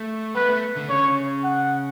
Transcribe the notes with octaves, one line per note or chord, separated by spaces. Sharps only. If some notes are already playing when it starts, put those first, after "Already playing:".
Already playing: A3
B3 B4
A3
D3
C#3 C#5
F#5